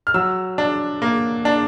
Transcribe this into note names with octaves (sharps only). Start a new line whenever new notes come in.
F6
F#3 E6
D4
A#3
D4